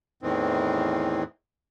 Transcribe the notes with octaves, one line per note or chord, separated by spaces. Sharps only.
E2 A2 D#3 E3 C4